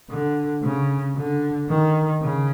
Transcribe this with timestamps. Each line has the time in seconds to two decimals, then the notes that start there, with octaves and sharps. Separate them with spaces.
0.10 D3
0.63 C#3
1.16 D3
1.69 D#3
2.22 C#3